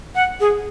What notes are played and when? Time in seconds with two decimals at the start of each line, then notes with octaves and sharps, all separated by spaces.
0.15 F#5
0.40 G#4